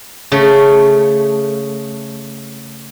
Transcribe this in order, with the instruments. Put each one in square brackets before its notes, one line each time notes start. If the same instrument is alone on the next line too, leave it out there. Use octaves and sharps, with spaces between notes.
[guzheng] C#3 A3